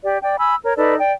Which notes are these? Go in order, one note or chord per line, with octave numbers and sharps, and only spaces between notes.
G4 D5
D5 G5
G#5 B5 E6
A#4 C#5
D#4 A4 B4 D5
D5 G5